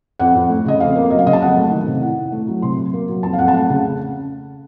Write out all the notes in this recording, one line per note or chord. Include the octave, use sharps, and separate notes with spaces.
F2 F#5
F2
A3
C#3 D#5
F2 F5
A#3
F#3 D#5
F5
C#3 D#5
A5
F2 F#5
A3
D#3
C3
A2 F#5
A2
A3
F#3
C3 C6
C3
A#3
F#3
F2 A5
F5
F2 F#5
A5
A3 F#5
C#3